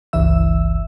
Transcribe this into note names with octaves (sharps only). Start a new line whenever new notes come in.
G1 C#2 E3 E5 E6